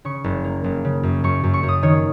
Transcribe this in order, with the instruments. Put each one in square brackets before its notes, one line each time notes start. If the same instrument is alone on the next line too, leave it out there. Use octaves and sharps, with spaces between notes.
[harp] C#3 C#6
F#1
A#3
F#1
C#3
F#2
F#2 C#6
F#2
C#6
F#2
D#6
D#3 C#5